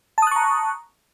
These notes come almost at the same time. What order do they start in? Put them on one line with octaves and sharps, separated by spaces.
A5 D#6 F#6 C#6 A#5